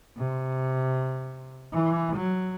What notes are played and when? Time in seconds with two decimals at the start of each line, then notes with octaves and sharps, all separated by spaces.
0.18 C3
1.73 E3
2.16 F#3